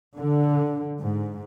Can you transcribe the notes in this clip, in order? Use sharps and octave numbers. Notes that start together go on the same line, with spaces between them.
D3
G#2